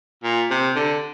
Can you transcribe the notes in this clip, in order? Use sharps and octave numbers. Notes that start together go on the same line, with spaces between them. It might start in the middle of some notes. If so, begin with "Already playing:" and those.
A#2
C3
D3